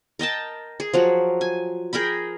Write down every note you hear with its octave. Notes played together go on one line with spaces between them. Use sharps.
A#4 D#5 G5 A5
G#4
F3 F#3 F#4
G#5
G#4 A#4 G5 B5